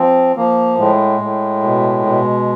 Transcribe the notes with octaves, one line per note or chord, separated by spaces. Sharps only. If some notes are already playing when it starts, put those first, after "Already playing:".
Already playing: F3 C4
F3 A#3
A2 G#3
A2
B2
B2